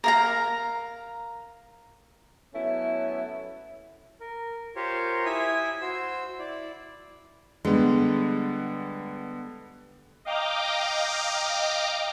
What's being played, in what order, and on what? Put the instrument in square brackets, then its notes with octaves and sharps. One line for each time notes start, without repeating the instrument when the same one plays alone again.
[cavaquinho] A#4 F5 A#5
[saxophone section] F#3 A3 B3 C#4 E4
[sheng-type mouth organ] A#4
F4 G4 A#4 C5 C#5
E4 E5 G#5 D#6
F#4 C5 E6
E4 D5
[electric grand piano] D3 G3 B3 [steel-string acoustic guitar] G#3
[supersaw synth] D#5 F5 G5 A#5 D6